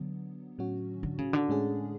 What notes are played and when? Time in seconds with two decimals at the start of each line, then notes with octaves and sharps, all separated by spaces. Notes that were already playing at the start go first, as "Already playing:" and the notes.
Already playing: D3 F#3 B3
0.58 A2 F#3 C#4 F#4
1.03 D3
1.18 C#3
1.33 D3
1.49 A2 G#3 C#4 G#4